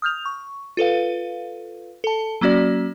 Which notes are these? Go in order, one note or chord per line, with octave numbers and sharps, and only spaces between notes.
D#6 F6 G6 F7
C#6
F4 A4 B4 F5
A4 A5
F#3 A#3 C#4 F#4 D5